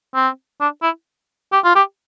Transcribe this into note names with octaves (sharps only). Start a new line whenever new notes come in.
C4
D4
E4
G4
F4
G4